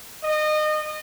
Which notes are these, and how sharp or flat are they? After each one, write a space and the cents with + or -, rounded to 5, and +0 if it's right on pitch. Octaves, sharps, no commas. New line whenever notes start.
D#5 -25